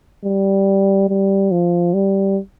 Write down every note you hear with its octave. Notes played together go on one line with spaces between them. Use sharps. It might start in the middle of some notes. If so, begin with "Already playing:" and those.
G3
G3
F3
G3